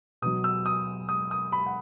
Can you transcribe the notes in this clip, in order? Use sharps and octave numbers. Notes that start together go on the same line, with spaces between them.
B2 F#3 D#6
E6
D#6
D#6
D#6
B5
F#5